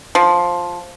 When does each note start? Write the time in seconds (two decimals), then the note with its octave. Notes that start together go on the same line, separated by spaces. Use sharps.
0.15 F3